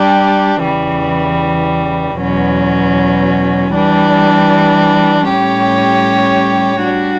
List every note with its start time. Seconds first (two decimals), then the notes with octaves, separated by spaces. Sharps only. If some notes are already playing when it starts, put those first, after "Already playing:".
Already playing: G3 D4 G4
0.64 E2 C#3 E3 G3
2.19 E2 B2 F#3 C#4
3.73 E3 G3 D4
5.27 A2 G3 C#4 G4 C#5
6.82 G3 D4 F#4